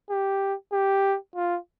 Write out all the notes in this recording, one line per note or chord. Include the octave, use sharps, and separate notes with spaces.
G4
G4
F4